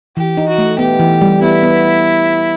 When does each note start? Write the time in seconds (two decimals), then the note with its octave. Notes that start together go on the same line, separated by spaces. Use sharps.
0.17 E3 G4
0.37 D#4
0.48 F#4
0.58 A3
0.79 B3 G4
1.00 E3
1.21 G3
1.42 B3 E4
1.63 B3